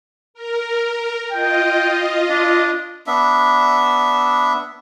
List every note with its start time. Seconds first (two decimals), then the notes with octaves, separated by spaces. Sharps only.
0.34 A#4
1.31 F4 D#5 G5
2.30 D4
3.07 B3 D4 E5